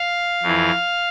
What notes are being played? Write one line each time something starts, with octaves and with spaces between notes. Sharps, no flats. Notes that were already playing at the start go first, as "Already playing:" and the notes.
Already playing: F5
F2 E3